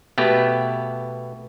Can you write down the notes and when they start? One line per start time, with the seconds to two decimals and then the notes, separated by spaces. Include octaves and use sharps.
0.18 B2 A3 B3 G4